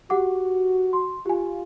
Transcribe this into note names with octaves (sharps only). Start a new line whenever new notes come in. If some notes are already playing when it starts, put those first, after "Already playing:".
F#4 G4 F#5 D6
C6
F4 G4 G#5